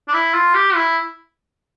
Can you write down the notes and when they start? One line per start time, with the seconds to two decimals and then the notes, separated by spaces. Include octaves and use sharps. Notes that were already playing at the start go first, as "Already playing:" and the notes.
0.08 D4
0.13 E4
0.34 F4
0.54 G4
0.75 E4